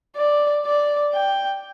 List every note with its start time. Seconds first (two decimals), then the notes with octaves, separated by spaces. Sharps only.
0.16 D5
0.65 D5
1.13 G5